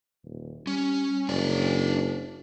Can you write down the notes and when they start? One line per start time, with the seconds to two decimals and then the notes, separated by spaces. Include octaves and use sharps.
0.24 D#1
0.67 G3 C#4
1.29 F#1 D4 C#5 D5